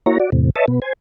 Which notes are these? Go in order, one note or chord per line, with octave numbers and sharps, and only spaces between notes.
A#3 E4 F#4 C#5 A#5
F#4 D5
E2 A2 C3
B4 C#5 D#5 E5 A5
B2 B3
C5 G#5